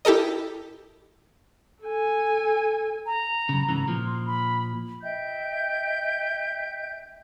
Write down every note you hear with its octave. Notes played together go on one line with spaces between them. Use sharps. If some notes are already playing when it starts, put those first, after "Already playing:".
E4 G4 A4 A#4 D#5
A4 G#5
A#5
F#2 C#3
G#2 C#3 E3
A#2 F3
C6
B5
D#5 E5 G5 G6